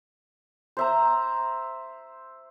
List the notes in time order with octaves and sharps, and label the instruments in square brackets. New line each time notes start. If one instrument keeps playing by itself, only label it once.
[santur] C5 E5 A#5